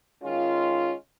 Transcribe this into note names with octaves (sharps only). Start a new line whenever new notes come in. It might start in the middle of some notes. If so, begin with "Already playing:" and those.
D#3 G#3 C#4 F4